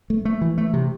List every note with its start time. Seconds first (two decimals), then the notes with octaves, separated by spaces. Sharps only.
0.10 A3
0.25 A3
0.41 E3
0.58 A3
0.73 C3